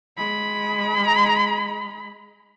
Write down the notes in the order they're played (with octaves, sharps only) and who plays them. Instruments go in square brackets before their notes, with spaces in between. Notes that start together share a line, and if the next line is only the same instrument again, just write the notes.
[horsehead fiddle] G#3 B5